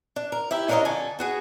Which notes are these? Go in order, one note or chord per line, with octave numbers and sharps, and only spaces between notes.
D4
A#4
E4 G4 E5
C#4 D4 F4 A#4 C#5 D#5
F2 D3 A4 G#5
B3 F#4 G#4